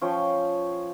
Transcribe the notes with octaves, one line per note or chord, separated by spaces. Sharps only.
F3 C#4 G5